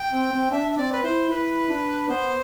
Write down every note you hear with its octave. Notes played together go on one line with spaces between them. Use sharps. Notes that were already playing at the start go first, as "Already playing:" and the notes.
Already playing: G5
C4
C4
D4 E5
E5
C4 D5
B4
E4 C5
E4 B4
D4
B3 C5